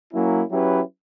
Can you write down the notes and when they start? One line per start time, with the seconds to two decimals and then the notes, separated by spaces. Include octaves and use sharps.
0.12 F#3 A#3 C#4 E4
0.50 F#3 C#4 E4 G4 B4